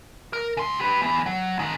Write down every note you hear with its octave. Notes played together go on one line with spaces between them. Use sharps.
A#4
C#3 C6
G4 B4
E3 B3
F#3
G#2 D#3